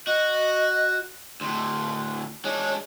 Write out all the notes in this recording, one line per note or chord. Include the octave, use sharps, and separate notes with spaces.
F#4 D#5
D2 A2 C6
G#3 D4 C#5